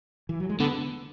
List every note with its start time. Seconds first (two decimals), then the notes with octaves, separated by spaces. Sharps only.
0.29 E3
0.40 F#3
0.49 G#3
0.60 D3 B3